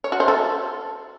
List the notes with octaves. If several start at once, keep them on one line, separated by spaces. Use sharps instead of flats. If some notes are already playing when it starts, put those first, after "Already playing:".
C#5
F#4
C5
A4